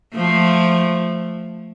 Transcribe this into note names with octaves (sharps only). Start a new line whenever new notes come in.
F3 A3